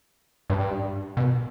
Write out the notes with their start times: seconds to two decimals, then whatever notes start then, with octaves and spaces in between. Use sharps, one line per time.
0.50 G2
1.17 B2